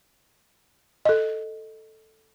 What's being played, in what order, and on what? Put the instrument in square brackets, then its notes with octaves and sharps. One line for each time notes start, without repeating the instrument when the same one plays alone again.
[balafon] A4 D#5